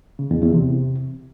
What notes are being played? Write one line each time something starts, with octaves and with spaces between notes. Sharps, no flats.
C#3
E2
E2
C3